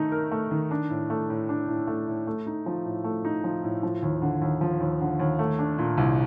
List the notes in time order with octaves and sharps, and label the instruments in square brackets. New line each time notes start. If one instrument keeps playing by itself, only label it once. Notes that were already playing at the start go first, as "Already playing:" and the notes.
Already playing: [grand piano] D#3 A3 D#4
A#4
A3
D#3
D4
A2
A3
A2
D4
A2
A3
A2
A3
D#4
F3
A2
A3
D#4
F3
A2
F3
D#2
D3
D#2
F3
D#2
D3
D#2
A3
D4
A#2
C2